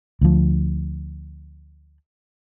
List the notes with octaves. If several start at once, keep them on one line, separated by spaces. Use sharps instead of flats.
D2 F3